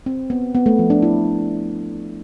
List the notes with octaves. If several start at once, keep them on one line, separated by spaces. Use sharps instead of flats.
C4
B3
B3
A3
F3
D4
E4